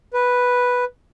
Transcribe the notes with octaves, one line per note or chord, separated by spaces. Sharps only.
B4